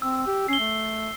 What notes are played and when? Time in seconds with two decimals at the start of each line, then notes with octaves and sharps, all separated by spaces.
0.02 C4 E6
0.27 G4
0.48 C#4 C7 G7
0.60 A3